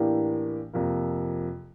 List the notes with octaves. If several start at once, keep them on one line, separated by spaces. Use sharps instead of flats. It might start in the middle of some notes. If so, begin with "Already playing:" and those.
Already playing: A2 E3 A#3 D4 G4
F2 C3 F3 A#3